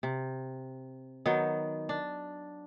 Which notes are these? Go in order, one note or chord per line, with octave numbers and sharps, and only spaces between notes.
C3
D#3 F#3 B3
D4